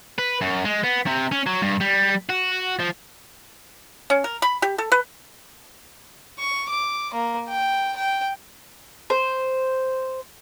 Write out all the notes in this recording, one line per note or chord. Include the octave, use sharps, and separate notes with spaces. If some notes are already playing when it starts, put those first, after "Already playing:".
B4
F#2
G#3
B3
C3
C#4
F#3
G2
G3
F#4
F3
C#4
A#4
B5
G4
A4
B4
C#6
D6
A#3
G5
G5
C5